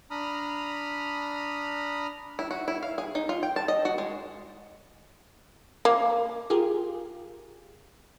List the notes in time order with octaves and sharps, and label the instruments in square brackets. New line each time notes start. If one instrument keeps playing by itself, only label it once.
[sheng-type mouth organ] D4 A#5 B5 D#6 F6
[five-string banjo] E4
F#4
E4
F5
G#4
D#4
F4
G5
A5
D#5
F#4
G#3
[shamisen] A#3
[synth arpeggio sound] F4 G4 G#4 A#4